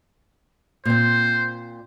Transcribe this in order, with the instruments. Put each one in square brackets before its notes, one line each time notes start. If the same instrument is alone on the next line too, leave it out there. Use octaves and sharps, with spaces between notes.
[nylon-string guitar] A#2 C4 [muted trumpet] C5